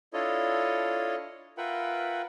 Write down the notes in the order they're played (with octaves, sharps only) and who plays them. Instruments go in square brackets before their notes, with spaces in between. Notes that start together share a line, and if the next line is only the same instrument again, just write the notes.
[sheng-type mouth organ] D4 E4 F4 A4 C#5 D#5
F4 A#4 B4 E5 F#5 G5